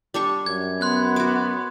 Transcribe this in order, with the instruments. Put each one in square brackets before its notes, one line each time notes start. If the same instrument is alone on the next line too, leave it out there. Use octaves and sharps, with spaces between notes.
[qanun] G3 D4 C#6
[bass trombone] F#2 [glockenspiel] G#6
[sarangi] B3 [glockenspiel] C6 F#6 G#6
[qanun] F#4 D6